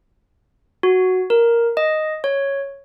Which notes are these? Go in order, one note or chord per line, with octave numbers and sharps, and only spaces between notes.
F#4
A#4
D#5
C#5